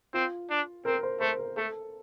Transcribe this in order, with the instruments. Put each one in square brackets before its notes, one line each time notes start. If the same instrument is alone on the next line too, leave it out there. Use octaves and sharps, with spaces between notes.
[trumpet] C4 [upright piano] F4
[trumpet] D4
[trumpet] C4 [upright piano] A#4
[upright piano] C5
[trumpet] A3 [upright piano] C5
[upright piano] A#4
[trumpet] A3 [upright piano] A4